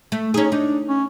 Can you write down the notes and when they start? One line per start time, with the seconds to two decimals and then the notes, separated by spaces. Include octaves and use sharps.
0.12 A3
0.34 C#4 D#4 G#4
0.52 D4 D#4
0.89 C#4